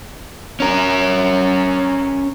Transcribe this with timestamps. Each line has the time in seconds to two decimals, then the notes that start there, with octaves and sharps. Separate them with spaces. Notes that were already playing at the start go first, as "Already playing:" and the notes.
0.60 C#4 A#4